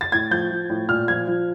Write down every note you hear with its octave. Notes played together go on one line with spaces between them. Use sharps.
A6
A2 G#6
F3 G6
F3
A2
A#2 F6
F3 G#6
F3